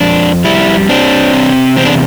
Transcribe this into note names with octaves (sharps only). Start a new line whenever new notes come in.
F2 D4
G3 E4
C4 D4
C3
E2 C4
D4